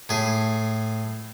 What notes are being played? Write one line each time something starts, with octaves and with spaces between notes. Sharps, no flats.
A2 G#4